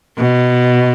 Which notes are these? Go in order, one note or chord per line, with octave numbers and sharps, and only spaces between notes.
B2